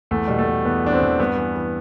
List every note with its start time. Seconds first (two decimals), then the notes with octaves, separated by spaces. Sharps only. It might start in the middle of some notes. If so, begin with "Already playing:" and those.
0.11 E2 A3
0.28 B2 G3
0.39 A3
0.47 B2
0.65 E2 B3
0.84 E2 D4
0.93 C4
1.01 E2
1.20 G2 B3
1.37 E3
1.56 E3